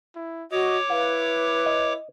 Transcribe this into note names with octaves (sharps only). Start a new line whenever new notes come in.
E4
F#4 C#5 D#5 D6
E4 B4 F5
D#5